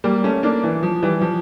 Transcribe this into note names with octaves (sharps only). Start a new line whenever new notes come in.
G3 A#3
A3 C#4
A#3 D4
E3
F3
E3 G3
F3